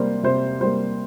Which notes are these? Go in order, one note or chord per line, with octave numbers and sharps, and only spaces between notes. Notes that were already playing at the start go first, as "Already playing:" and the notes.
Already playing: C3 G3 A#3 C5
C3 C5
G3 A#3 C5